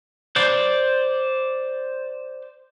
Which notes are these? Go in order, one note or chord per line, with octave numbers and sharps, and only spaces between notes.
C5 D5